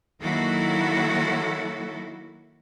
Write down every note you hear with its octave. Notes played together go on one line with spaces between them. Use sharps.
D#3 F#3 A#3 E4 F#4 A4